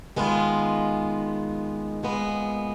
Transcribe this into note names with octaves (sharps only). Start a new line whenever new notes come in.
D#3 G#3 B3 F4
A#2 G#3 B3